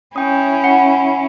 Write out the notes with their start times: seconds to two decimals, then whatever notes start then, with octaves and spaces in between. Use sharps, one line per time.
0.16 C#4 E4 G5 D#6
0.64 F#5 C#7